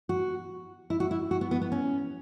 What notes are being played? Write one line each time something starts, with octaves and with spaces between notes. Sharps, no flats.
F#4
E4
F#4
E4
F#4
B3
B3
B3
C#4